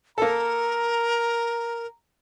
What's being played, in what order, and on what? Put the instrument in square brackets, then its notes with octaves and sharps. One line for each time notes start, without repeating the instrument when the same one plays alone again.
[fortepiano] A#3 A4 [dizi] A#4 [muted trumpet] A#5